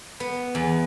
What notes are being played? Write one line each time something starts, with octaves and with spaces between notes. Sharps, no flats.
B3
E2